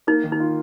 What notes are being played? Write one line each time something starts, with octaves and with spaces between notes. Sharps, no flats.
A#3 D#4
D#3
D#4
F4